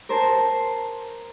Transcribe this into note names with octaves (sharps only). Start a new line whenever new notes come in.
A#4 C5 A5 C6